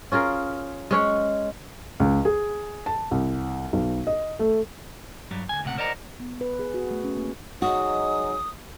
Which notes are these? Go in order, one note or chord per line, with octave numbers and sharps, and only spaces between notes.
C#4 F4 G#4 A#4
G#3 C#4 C#5
C#2
G#4
A5
C2
B1
D#5
A3
G2 F#3 G3
D2 G#5
C#2 A2 C3 F#5
A#4 C5 D5 D#5 F#5 A#5
B3
B4
G#4
F#4
A3
C#4
A#3
F#3 G#3 D#4 F#4 D#6